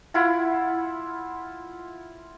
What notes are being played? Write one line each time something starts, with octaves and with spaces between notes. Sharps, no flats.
E4 F4 F#5 B5